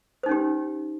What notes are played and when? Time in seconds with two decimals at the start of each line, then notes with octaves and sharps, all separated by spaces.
0.23 C5
0.26 D#4
0.29 C#4
0.31 G4